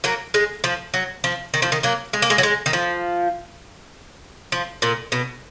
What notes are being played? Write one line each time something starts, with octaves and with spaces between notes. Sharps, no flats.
F#3 A#3
G#3
F3
F#3
F3
D#3
F3
D#3
F#3 A#3
G#3
A#3
G#3
F#3
G#3
D#3
F3
F3
A#2
B2